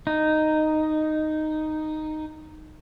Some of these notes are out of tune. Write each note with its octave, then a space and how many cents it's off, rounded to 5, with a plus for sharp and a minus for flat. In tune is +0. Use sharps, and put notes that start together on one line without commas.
D#4 -5